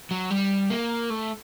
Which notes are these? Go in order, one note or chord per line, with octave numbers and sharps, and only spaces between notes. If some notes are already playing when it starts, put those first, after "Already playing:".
F#3
G3
A#3
A3